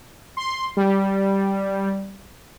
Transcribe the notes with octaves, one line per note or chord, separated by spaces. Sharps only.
C6
G3